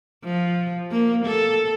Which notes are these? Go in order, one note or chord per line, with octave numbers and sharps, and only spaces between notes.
F3
A#3
A4